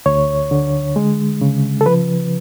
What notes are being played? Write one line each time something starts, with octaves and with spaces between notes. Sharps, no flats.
D2 C#5
D3
G#3
C#3
A4
F3 B4